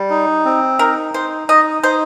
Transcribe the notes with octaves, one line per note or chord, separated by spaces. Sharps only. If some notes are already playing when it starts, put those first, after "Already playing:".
Already playing: G3
D#4
C4
D#4 A#4
D#4 C5
D#4 D#5
D#4 C5